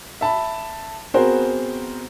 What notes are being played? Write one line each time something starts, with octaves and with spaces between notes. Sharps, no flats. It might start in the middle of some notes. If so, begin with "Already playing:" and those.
E5 A5 B5
B3 C4 F#4 G#4 A#4 C5